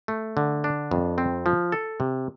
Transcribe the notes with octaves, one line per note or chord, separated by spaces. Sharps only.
A3
D3
D4
F2
C4
F3
A4
C3